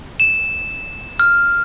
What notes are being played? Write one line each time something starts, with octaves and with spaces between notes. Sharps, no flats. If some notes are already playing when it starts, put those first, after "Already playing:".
E7
F6